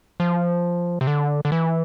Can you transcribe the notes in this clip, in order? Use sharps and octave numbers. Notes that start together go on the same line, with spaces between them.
F3
C3
D3
D3
E3